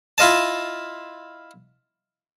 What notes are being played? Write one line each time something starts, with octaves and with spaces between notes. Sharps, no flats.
E4 F4 D#5 A5